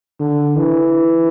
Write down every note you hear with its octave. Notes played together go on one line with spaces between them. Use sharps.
D3
E3